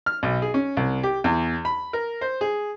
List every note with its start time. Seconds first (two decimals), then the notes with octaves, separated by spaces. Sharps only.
0.06 F6
0.23 B1
0.42 G#4
0.54 C#4
0.77 C2
1.03 G4
1.24 E2
1.65 B5
1.93 A#4
2.21 C5
2.41 G#4